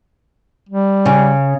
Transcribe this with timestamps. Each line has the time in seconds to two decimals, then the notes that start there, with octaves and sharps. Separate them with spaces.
0.69 G3
1.06 C#3